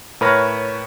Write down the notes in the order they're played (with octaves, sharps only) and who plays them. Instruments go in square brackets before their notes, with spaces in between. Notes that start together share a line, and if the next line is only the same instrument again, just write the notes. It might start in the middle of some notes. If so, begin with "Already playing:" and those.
[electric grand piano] A2 A#4 B4 C#5 F6 A#6